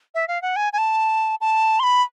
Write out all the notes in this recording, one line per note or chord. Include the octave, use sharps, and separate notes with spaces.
E5
F5
F#5
G#5
G#5
A5
A5
C6
B5